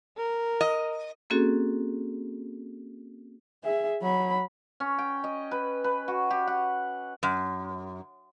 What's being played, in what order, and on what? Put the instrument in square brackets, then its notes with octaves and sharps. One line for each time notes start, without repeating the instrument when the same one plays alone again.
[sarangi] A#4
[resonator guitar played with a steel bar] D#5
[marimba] A#3 C4 C#4 F#4 G#4 A4
[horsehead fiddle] G#4 E5
F#3 B5
[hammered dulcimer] C#4
G5
D#5
B4
B4
F#4
G4
F#5
[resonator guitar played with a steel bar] F#2